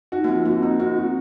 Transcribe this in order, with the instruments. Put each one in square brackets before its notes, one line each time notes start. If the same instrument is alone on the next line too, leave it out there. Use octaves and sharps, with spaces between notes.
[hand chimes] D#4 [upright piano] F#4
[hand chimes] A#3
[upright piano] F3 [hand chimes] C4
[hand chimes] A#3 [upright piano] F#4
[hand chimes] A#3 [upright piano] D#4
[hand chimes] C4 [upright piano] F#4
[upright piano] F#4